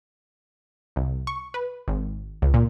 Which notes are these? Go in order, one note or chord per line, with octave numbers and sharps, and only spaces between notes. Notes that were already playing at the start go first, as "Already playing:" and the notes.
C2
C#6
B4
G#1
C#2
A#2